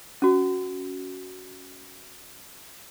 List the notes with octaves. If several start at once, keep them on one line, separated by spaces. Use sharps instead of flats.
C#4 F#4